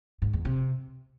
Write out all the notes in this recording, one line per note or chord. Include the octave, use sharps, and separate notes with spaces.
G#2
E2
C3